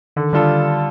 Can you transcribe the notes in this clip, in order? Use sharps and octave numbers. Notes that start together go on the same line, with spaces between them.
D3 D#3
D3 G3 D4 F4 A4